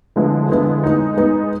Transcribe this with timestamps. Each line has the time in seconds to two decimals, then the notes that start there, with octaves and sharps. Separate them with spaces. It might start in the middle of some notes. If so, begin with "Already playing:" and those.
0.16 D3 F3 G#3 B3 E4
0.50 D3 F3 G#3 B3 E4
0.83 G#3 B3 D#4
1.17 G#3 B3 D#4